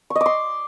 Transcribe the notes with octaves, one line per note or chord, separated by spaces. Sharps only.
C#6
D#5
D6
C6